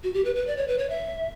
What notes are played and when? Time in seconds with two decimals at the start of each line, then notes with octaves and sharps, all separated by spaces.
0.04 F#4
0.14 G4
0.25 B4
0.36 B4
0.47 D5
0.57 C#5
0.68 B4
0.78 C#5
0.90 E5